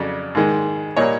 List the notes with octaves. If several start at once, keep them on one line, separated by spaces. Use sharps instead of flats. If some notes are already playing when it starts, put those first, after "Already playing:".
Already playing: F2 C#3 F#3 D5
G#2 D#3 G#3
A#2 G3 A#3 C#5 D#5